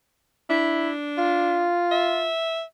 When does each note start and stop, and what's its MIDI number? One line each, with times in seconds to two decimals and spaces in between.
0.50 1.74 62
0.50 0.91 64
1.18 2.29 65
1.91 2.62 76